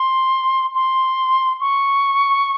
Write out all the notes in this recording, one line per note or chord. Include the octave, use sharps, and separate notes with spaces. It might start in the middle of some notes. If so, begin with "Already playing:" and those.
Already playing: C6
C6
C#6